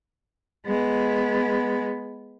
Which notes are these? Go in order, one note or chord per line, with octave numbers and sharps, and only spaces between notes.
G#3 B3